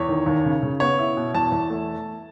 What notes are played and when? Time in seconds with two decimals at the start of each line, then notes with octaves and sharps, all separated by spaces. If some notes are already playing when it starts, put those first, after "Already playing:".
Already playing: E2 C#5
0.09 D#3
0.26 D#2
0.45 C#3
0.63 C#3
0.80 B3 C#5
0.99 E4
1.17 B2
1.34 E2 A5
1.52 E2
1.70 A3